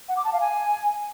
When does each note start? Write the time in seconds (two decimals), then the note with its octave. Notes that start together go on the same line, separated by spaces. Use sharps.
0.09 F#5
0.17 D6
0.25 A5
0.33 F5
0.41 G#5